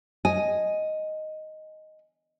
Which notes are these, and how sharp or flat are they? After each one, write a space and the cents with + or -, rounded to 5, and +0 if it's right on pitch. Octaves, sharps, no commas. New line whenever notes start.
D#5 +0 G#5 +0